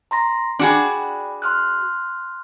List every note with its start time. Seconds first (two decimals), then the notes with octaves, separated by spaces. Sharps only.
0.11 A#5 C6 A#6
0.59 D4 F#4 G#4 D5 G5 B5
1.42 C6 F6 F#6